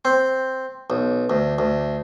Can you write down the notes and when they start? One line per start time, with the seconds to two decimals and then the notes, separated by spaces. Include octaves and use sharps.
0.05 C4
0.90 B1
1.30 D2
1.58 D2